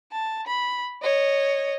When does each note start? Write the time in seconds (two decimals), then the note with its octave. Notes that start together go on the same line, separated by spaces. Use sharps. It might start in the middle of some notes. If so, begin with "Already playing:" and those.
0.12 A5
0.47 B5
1.02 C#5 D#5